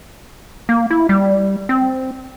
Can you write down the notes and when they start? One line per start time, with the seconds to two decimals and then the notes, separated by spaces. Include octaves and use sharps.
0.69 A#3
0.91 E4
1.09 G3
1.69 C4